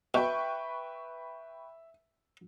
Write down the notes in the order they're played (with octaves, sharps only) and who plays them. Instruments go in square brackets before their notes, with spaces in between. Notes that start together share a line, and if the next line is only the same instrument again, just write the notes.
[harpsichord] B2 [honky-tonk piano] B4 G5 C#6 [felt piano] E5